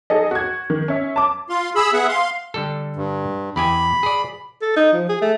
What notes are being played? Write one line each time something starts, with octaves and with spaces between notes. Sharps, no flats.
D#4 G#4 A4 D#5
F#4 G#6
D#3
C#4 E5
A5 D6
F4 F5 C6
G#4 B5 E6
B3 G#4 E5 F#5
F5 C6
D3 G3 A4
G2
E2 G4 G#5 B5
G#4 D5
A4
D#4
F3
G#4
A3